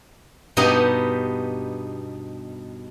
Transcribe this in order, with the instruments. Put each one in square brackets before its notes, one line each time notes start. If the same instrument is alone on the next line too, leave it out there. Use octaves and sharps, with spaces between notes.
[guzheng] G2 B2 B3 D#4 G4 D#5